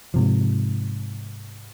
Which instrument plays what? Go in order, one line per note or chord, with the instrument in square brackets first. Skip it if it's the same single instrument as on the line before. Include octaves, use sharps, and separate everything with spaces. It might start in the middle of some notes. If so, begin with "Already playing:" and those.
[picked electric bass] G#2 C3 F3